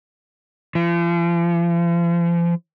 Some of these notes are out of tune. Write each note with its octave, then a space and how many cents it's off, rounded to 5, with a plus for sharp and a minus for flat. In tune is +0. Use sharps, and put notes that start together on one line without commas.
F3 -40